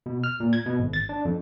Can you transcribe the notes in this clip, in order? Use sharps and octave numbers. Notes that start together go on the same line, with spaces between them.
B2
F6
A#2
G#6
B2
G#1
A6
D4
F2